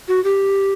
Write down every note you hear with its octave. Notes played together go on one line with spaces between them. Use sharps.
F#4
G4